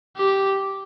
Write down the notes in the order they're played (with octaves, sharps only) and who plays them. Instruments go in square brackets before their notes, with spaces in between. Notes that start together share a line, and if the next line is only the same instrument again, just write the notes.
[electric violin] G4